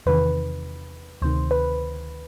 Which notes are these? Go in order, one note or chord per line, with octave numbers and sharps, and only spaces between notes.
E2 C3 D#3 B4
D2 C3 D#3 C5
B4